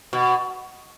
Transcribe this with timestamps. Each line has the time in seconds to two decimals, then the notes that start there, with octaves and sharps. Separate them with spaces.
0.13 B2